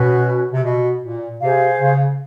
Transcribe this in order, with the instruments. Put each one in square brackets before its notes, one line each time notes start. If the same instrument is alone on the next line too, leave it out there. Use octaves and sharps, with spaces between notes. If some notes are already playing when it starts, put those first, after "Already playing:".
Already playing: [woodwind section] B2 [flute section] C#4 F#4 B4
[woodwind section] C3
B2
A#2
[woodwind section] C3 [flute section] G#4 C5 F5
[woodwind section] C#3